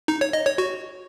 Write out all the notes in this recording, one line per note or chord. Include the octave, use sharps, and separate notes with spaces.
D#4
C#5
D#5
C#5
F#4